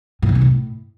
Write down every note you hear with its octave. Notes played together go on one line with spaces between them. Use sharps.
A#2
C#3
C3
A2